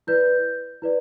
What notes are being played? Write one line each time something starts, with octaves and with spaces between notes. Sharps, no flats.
E4 B4 D5 G6
E4 B4 D5